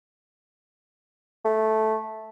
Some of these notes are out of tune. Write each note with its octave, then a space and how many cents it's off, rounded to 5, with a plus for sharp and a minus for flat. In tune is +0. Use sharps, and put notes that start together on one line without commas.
A3 -10